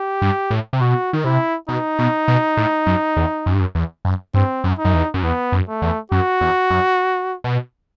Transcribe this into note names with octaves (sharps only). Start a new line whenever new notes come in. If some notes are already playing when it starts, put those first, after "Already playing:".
Already playing: G4
G2
A2
C3
B2 F#4
D#3
C3 E4
B2 D#4
B2
B2
A2
F#2
E2
F#2
G2
F#2
E2
F#2
G2 C4
F#2
D#4
F#2
E2
F#2
E2 B3
F#2
A3
E2
F#2 F#4
E2
F#2
B2